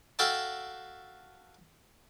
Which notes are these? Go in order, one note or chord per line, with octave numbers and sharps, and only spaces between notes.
F#4 A4 E5 F5 G5 A5